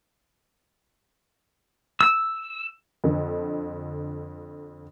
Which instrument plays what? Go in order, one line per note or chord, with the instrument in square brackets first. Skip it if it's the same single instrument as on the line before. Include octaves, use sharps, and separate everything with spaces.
[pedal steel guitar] E6
[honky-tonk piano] F2 D3